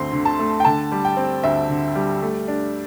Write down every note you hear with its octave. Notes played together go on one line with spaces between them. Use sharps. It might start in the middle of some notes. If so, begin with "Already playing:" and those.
Already playing: D2 A3 C4 C6
D3
A5
A3
G5
D3 A5
G3
G5
C4
D2 E5
D3
G3
A3
D4